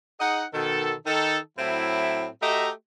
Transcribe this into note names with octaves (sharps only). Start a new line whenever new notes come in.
D#4 G#4 D#5 F#5
B2 D#3 A4
D#3 D#4 A4
A2 F#3 C4 E4
A3 F#4 G4 D#5 E5 A#5